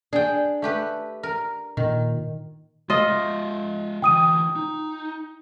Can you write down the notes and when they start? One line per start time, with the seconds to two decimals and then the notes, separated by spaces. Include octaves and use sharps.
0.13 D4 G#4 G5
0.62 A3 G4 B4
1.23 A#4
1.77 A#2 D#3
2.90 F4 A4 D#5
3.07 G#3 E5
4.02 D3 E3 G5 D#6 D#7
4.55 D#4